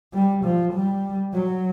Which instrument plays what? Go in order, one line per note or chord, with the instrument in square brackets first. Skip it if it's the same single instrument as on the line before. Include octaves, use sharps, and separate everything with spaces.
[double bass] G3
F3
G3
F#3